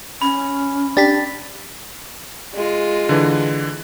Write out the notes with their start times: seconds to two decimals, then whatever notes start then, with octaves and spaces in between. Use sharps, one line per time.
0.22 C#4 B5
0.97 D4 G4 A6 B6
2.54 G#3 F4
3.09 D3 E3